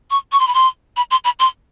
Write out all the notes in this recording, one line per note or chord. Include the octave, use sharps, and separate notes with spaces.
C#6
C#6
C6
B5
C6
B5
C6
B5
C6